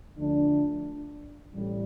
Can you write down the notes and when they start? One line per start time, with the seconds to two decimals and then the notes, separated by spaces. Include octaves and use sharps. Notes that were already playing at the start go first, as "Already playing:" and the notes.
0.16 D2 D3 F3 A3 D4
1.53 A1 A2 G3